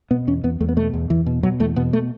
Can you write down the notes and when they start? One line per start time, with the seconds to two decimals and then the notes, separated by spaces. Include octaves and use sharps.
0.11 B2 B3
0.27 E2 C#4
0.44 E2 B3
0.60 E2 A3
0.69 B3
0.77 B2 A3
0.93 E2
1.10 E2 E3
1.26 B2
1.43 B2 F#3
1.60 E2 A3
1.76 B2 B3
1.93 A3